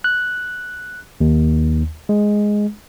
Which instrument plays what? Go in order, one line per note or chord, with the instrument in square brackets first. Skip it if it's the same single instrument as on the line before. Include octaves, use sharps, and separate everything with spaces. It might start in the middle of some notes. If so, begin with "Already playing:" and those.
[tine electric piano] F#6
D#2
G#3